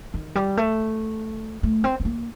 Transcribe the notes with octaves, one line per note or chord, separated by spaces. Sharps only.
D#3
G3
A3
A3
C4
C4
A#3